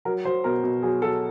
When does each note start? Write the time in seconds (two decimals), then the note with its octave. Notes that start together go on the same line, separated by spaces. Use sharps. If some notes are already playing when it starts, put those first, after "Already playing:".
0.05 F#3 A#4
0.25 F#3 C5
0.44 B2 A#4
0.64 B2
0.83 F#3 G#4
1.02 F#3 A4